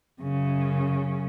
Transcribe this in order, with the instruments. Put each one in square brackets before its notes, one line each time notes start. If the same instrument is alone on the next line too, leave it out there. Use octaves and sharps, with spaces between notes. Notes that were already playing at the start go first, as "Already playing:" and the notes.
[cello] F#2 C#3